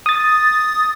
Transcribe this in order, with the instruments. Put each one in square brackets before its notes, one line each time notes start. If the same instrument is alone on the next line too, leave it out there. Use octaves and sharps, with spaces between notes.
[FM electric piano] D#6 A6